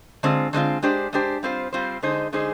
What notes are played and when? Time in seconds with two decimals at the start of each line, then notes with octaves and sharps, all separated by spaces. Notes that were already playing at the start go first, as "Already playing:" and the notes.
0.23 D3 G#3 C4 F4
0.53 D3 G#3 C4 F4
0.83 G#3 D4 G4 C5
1.13 G#3 D4 G4 C5
1.43 G3 C4 F4 C5
1.73 G3 C4 F4 C5
2.02 D3 G#3 D#4 G#4 C5
2.33 D3 G#3 D#4 G#4 C5